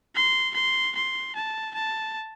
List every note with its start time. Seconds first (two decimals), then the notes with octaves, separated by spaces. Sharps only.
0.15 C6
0.54 C6
0.95 C6
1.35 A5
1.74 A5